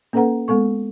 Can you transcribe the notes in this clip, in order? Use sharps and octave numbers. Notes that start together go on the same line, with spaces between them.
A#3 C#4 A4 B4 F#5 A#5
G#3 B3 A4 C#6